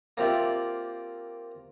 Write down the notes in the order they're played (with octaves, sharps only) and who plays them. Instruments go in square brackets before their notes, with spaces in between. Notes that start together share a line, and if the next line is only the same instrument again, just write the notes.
[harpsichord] A#3 C4 F4 G4 D5 E5